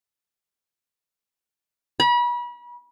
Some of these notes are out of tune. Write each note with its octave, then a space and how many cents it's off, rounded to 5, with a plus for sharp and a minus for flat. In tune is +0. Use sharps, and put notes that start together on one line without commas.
B5 -35